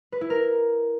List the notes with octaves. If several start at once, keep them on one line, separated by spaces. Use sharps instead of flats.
B4
E4
A#4